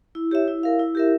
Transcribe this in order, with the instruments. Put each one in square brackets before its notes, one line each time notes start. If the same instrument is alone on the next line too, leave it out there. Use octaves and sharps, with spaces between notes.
[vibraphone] E4
G4 C#5 E5
E4
A#4 F5
E4
G4 A#4 E5